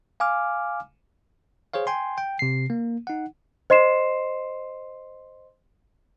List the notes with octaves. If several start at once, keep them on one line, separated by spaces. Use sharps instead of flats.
F5 G#5 D6 F6
G#4 C5 C#5 F5
G5 G#5 C6
G5
C3 C7
A#3
D#4 F#5
C5 D#5 C6 C7 E7